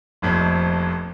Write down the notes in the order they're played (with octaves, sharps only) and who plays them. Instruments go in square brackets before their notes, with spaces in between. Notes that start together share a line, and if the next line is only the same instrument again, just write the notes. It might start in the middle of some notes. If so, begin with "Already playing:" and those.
[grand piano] F1 A#1 F2